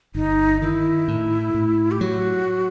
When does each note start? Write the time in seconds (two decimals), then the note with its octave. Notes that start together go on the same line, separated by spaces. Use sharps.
0.15 G1 D#4
0.62 D#3 E4
1.08 A2
1.54 A2
1.91 G4
2.01 F#3 F#4